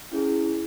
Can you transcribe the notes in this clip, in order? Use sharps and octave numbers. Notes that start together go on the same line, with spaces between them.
C#4 E4 G#4